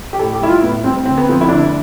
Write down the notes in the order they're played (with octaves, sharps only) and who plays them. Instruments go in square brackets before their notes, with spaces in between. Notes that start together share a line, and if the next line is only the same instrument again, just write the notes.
[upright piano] G4
A2 A4
G4
G3 E4
F4
A2 B3
G3 C4
D2 C4
B3
D3 F3 C4
E4
D2 D4